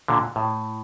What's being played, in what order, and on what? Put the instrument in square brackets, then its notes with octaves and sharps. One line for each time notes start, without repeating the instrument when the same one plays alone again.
[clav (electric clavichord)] A#2 D3
A2